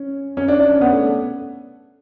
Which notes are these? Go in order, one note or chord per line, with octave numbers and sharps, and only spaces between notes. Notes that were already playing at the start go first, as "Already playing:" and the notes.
Already playing: C#4
C#4
D4
D4
C#4
B3
A3